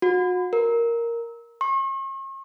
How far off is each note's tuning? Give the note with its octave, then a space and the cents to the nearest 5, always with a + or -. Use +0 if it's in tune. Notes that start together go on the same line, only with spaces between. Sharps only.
F#4 -35
A#4 +0
C#6 -45